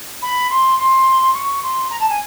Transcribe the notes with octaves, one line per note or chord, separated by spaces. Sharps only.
B5
C6
C6
C#6
C6
A#5
A5
G#5